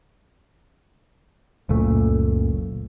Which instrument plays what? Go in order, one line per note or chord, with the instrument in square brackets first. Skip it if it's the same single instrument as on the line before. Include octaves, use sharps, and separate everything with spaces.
[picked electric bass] F#1 C#2 A#2 A3